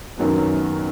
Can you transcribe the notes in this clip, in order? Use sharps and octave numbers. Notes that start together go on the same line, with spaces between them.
F#2 D#3 F#3 B3